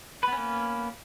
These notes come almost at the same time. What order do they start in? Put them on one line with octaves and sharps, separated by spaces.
B4 B3 C#4 A#3